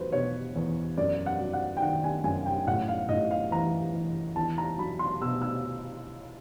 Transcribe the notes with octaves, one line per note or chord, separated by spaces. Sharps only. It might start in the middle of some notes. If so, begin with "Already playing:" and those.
Already playing: E2 F#3 B4 C5
B2 C#5
E2
F#2 D5
F#5
F#3
F#5
G5
D#3 F#5
G#5
F#2 G#5
G5
A2 F#5
F5
A2 D#5
F5
E3 A#5
E3
E2 A5
A#5
F#3 B5
C6
B2 E6
E6